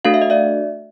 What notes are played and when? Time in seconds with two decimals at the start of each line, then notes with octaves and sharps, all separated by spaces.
0.05 A3 D4 F#4 A4 F5
0.14 E5
0.22 D#5
0.30 D5 E5